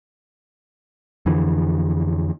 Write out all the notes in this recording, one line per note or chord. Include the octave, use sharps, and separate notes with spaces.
F2 D3 E3